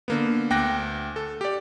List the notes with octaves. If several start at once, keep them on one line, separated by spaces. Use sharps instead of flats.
D3 A#3 B3
D2 G5 D6 F#6 A#6
A4
G4 D5